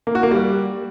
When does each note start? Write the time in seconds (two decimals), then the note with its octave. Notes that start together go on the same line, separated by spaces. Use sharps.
0.07 A#3
0.15 F#4
0.23 A#3
0.31 G3